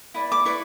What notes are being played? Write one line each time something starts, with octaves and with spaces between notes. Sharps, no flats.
E4 B4 D5
D6
E4 B4 D5 C#6